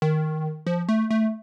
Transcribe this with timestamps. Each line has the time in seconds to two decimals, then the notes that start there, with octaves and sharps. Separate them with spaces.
0.02 D#3
0.67 F3
0.89 A3
1.11 A3